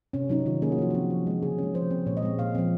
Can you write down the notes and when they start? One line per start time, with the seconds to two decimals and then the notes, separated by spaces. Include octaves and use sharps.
0.13 C3 C#4
0.29 F#3 C#4 D#4
0.46 D#3 F4
0.62 A#3 C#4 G#4
0.72 F#4
0.78 F3 F4
0.90 C4 F#4
1.10 F3
1.27 G#3 C#4
1.42 C#3 G#4
1.58 G#3 C#4
1.74 F3 C5
1.91 C4
2.06 A#2 C#5
2.17 D#5
2.22 G#3 C4
2.39 A#2 F5
2.55 F3 C4